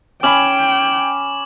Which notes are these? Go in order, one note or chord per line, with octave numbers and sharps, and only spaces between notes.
C#4 G5 G#5 B5 D6 F#7